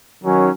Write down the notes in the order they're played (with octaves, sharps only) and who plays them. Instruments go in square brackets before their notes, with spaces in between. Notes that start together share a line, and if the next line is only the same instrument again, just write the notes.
[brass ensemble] D#3 F#3 C#4